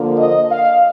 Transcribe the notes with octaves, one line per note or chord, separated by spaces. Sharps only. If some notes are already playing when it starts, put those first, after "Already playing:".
Already playing: D3 F3 A#3
D#5
F5